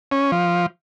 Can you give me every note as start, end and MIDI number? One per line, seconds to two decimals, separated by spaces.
0.11 0.31 61
0.32 0.66 53